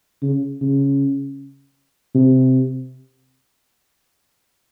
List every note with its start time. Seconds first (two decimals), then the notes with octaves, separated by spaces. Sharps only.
0.22 C#3
0.61 C#3
2.15 C3